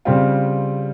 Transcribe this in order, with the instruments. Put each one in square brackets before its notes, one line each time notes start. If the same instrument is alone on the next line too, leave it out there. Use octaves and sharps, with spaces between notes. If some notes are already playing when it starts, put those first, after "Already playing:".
[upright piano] C#3 G3 C4 F4